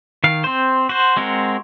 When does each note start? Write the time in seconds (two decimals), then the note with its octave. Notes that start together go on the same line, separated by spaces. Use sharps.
0.24 D#3 F5
0.44 C4 C5
0.89 F#4 C5
1.17 G#3 C4 F#4 A#4